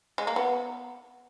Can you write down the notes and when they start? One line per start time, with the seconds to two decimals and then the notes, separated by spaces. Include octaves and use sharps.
0.18 G#3
0.27 A#3
0.36 B3